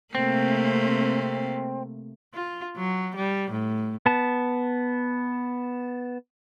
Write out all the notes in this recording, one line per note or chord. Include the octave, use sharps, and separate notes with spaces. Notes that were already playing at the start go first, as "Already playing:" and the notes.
C3 A3 A#3 C4
F4
F#3
G3
A2
B3 A5